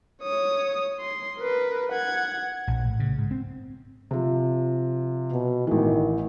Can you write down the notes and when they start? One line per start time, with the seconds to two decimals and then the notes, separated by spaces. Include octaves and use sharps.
0.23 C#5 D#6
1.00 C6
1.38 A#4 B4
1.93 F#5 G#6
2.67 A#1
2.84 A2
3.00 C#3
3.18 G#2
3.31 C4
4.11 C3 F3
5.32 B2
5.67 A1 D#3 E3